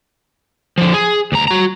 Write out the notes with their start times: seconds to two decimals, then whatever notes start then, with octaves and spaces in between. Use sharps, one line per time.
0.78 D3 F3
0.94 G#4
1.32 D2 A#5
1.48 F#4 A#5